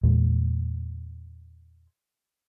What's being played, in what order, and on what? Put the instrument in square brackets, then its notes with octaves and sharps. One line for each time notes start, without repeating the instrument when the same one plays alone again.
[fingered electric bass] E2 A#2 G#3